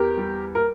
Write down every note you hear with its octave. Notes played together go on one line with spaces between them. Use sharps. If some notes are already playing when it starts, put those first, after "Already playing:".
Already playing: E2 G4 A#4
G3
A#4